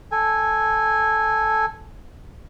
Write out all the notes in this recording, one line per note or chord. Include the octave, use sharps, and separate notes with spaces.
A4 G#5